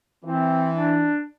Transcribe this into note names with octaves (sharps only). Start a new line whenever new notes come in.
E3 C4
D4